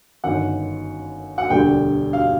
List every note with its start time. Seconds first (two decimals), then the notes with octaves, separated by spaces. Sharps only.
0.24 G1 F#2 D#3 F#5
1.38 F#5
1.50 E1 D2 D3 G3 G5
2.13 F5